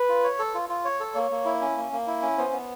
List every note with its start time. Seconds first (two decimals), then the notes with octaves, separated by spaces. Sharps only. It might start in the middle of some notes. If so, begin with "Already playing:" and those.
Already playing: B4
0.09 F4
0.24 C#5
0.39 A4
0.54 F4
0.69 F4
0.85 C#5
1.00 A4
1.15 A#3 C#5
1.31 A#3
1.45 E4
1.61 C#4
1.77 A#3
1.92 A#3
2.07 E4
2.22 C#4
2.38 B3 C5
2.53 B3